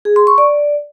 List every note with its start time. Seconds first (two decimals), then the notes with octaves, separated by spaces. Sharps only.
0.05 G#4
0.16 C6
0.27 C#6
0.38 D5